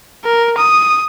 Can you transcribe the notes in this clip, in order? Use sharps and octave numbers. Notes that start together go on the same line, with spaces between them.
A#4
D#6